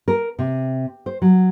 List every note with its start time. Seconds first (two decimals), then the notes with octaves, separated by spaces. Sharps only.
0.08 A#4
0.39 C3
1.06 C5
1.22 F#3